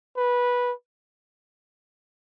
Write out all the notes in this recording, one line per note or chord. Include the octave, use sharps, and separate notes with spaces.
B4